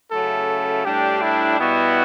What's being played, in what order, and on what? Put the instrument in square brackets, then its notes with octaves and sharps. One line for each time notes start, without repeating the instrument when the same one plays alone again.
[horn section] C#3 F#3 A3 C#4 E4 [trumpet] A4
[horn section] A2 G3 D4 [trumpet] G4
[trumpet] E4
[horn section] B2 G3 B3 F#4 [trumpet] E4